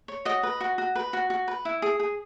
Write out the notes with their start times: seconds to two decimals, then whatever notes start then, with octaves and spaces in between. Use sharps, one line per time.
0.08 C#5
0.25 F#4 D#5
0.43 B4
0.61 F#4
0.78 F#4
0.95 B4
1.13 F#4
1.30 F#4
1.48 B4
1.65 E4
1.82 G#4
2.00 G#4